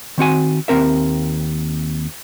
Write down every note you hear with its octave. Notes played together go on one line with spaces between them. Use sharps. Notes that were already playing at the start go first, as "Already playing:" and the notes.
D#3 C4 F#4 G#5
D#2 C4 A#4 E5